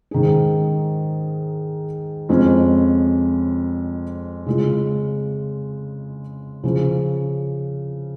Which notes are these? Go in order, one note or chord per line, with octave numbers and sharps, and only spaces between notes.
G#2 D#3 C#4 G#4
F2 F3 G#3 C#4
C#3 G#3 F4
C#3 F3 C#4